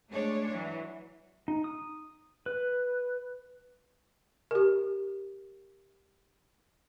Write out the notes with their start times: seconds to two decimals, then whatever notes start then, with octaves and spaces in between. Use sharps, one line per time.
0.10 G#3 A3 D4 C#5
0.52 E3 F#3
1.48 D#4
1.64 D#6
2.46 B4
4.51 G4 A#4